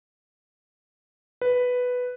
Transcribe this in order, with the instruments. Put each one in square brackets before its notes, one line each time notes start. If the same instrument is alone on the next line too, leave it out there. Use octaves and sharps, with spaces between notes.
[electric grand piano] B4